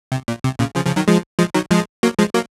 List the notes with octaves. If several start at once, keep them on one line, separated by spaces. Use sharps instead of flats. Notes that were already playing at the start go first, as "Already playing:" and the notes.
C3
A#2
C3
A#2 C#3
C#3 F3
C#3 F3
D#3 F#3
F3 G#3
F3 G#3
D#3 F#3
F3 G#3
F#3 A#3
F3 G#3
F#3 A#3